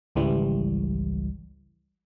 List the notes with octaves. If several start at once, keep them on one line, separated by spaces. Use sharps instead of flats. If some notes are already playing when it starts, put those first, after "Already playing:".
G#1 C#2 E3 G3